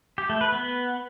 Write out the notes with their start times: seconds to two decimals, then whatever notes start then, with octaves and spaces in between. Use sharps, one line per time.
0.18 G4
0.29 A3
0.41 B4
0.52 B3